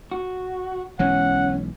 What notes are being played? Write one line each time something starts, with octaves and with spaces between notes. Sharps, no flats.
F#4
B1 E3 G#3 C#4 F#5